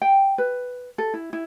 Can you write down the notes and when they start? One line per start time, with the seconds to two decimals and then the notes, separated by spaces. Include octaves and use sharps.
0.02 G5
0.38 B4
0.98 A4
1.14 E4
1.33 E4